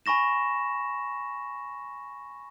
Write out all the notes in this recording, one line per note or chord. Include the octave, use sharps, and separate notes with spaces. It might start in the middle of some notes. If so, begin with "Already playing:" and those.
G#5 B5 C#6 A#6 E7